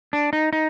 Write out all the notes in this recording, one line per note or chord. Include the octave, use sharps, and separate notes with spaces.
D4
D#4
D#4